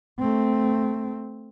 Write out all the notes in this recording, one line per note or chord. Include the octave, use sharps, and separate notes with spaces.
A3 C4